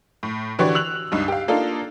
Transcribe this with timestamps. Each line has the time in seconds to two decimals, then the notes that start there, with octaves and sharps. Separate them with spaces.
0.23 A2
0.59 D3 E3 F#4 G4 C#5 D5
0.75 E6 F#6 F7 F#7
1.12 C#2 G2 D#4
1.28 G4 F5
1.48 A#3 D4 D#4 F4 A4